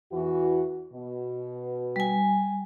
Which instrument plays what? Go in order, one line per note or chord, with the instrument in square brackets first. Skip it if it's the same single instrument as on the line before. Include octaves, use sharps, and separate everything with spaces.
[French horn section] E2 E3 F#4
B2
[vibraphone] G3 G#5